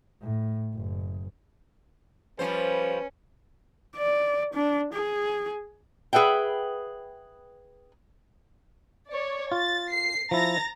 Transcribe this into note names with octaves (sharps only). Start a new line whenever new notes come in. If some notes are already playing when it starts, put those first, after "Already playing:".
A2
F#1
F3 G3 C#4 B4 C5
D5
D4
G#4
G#4 B4 E5 F#5 G5
C#5 D5
F4 A6
C7
F3 E4 A#5 A6 A#6